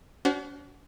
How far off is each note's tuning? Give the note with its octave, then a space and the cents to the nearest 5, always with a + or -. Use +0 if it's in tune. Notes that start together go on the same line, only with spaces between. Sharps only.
D4 -45 F#4 +20 C5 +0